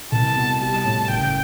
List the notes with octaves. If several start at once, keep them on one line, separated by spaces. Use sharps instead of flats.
C2 A5
B2
G3 A5
A2
F#1 G5